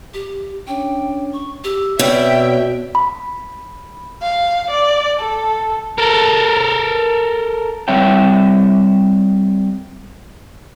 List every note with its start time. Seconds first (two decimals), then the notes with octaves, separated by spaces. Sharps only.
0.14 G4
0.67 C#4 D4 C#5 G5
1.33 C#6
1.64 G4 E6
1.99 B2 C4 F#4 C#5 D5 E5 G5
2.95 B5
4.22 F5
4.71 D5
5.20 A4
5.98 A4 A#4
7.88 G3 C4 C#5 E5 G5